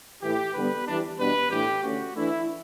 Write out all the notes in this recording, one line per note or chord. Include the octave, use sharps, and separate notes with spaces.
A2 E3 A3 E4 G4
D3 G3 B3 B4
E3 G3 D4
B2 G3 B3 D4 B4
A2 E3 A3 D4 G4
D3 A3 C#4 F#4
E3 A3 D4 E4